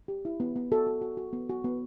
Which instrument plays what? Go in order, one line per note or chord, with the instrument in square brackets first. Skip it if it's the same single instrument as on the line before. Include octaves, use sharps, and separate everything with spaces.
[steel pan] G4
E4
B3
B3
F#4 A4
F#4
F#4
F#4
B3
F#4
B3